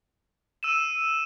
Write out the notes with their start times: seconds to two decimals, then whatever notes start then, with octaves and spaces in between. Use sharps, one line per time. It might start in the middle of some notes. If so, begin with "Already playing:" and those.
0.63 E6 D#7 E7